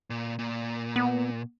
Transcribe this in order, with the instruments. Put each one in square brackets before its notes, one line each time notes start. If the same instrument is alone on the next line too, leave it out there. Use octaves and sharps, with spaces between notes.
[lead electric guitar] A#2
A#2
[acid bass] B3